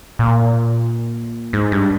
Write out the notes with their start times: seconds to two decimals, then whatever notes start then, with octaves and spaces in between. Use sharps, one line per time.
0.19 A#2
1.53 G#2
1.72 G2